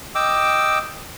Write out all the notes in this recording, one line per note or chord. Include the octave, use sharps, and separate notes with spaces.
D#5 G5 D6 E6